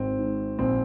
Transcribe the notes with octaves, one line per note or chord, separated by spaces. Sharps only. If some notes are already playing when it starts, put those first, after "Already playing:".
Already playing: G#1 C4
G#2
A#1 C4